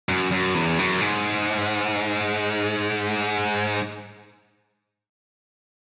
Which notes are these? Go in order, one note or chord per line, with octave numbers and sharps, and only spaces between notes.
F#2
F#2
E2
F#2
G#2